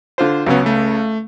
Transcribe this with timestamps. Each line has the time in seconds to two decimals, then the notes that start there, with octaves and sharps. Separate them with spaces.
0.18 D3 F4 C5
0.46 C#2 C#3 F#3 B3 C#4
0.66 A3